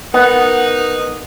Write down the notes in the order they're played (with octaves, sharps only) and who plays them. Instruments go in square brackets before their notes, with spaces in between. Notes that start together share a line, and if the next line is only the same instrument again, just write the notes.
[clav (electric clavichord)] B3 [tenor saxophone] D#4 [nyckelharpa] A#4 F#5